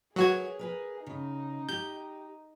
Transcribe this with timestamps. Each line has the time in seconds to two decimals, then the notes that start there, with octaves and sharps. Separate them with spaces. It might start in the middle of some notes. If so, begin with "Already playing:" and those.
0.16 F#3 F#4 G#4 A#4 B4 C#5 G#6
0.59 A#4 B4 G#5
1.07 C#3 D#4
1.69 G4 G6